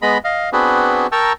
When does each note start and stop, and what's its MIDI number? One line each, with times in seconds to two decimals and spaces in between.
0.02 0.18 56
0.02 0.18 59
0.02 0.18 75
0.02 0.18 83
0.24 0.50 75
0.24 0.50 77
0.53 1.07 59
0.53 1.07 60
0.53 1.07 62
0.53 1.07 66
0.53 1.07 68
0.53 1.07 71
1.12 1.33 70
1.12 1.33 79
1.12 1.33 81
1.12 1.33 82
1.12 1.33 85
1.12 1.33 88